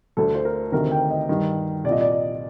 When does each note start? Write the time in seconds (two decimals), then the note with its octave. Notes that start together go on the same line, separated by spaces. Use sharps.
0.17 D2 D3 A4
0.35 C5
0.45 A#4
0.72 D2 C3 D#3 A#4
0.91 G5
1.10 D#5
1.29 G2 D#3
1.84 C2 D5
1.89 A#2 D#5
2.01 D5
2.12 D#5